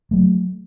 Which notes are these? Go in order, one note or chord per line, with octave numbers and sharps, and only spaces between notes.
F#3 A3